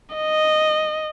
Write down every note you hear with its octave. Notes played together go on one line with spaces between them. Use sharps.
D#5